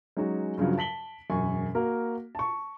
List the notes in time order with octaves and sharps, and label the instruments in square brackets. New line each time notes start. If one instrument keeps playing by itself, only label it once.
[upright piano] F#3 G#3 C#4 D#4 F#4
G2 C#3 F3 F#3
A5 B6 F#7 G7
E1 F#2 G#5 C#6
A#3 F#4 A#4
A5 C#6